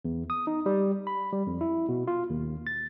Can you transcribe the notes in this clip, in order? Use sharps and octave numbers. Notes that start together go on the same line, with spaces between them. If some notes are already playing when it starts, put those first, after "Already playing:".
E2
D#6
D#4
G3
B5
G3
F2
E4
B2
F4
D#2
A6